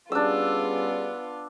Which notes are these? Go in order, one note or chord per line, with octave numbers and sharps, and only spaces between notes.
G3 B3 C#4 D4 F4 G#4 E6